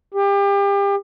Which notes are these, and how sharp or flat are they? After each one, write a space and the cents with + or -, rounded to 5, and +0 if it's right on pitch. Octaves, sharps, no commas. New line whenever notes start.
G4 +30